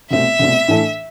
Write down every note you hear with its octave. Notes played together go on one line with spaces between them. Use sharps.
C2 B2 A3 C4 E5
C2 B2 A3 C4
A2 E3 A3 D4 A4